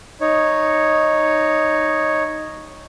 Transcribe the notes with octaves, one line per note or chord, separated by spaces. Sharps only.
D#4 C#5